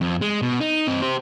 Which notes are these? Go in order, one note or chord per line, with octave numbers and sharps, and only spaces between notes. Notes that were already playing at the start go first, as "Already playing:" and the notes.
F2
G#3
B2
D#4
C4 D#5
G4 C5